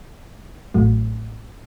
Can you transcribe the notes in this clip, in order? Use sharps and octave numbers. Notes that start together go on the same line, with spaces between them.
A1 A2 F#3 A3